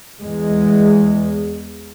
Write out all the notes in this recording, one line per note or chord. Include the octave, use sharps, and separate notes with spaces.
E2 G#3